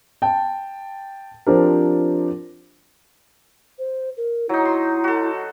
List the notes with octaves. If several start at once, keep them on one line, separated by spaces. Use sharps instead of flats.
G5 A5
F3 C4 D4 G4 A#4
C5
A#4
F#3 D#4 E4
C6
F#4 A4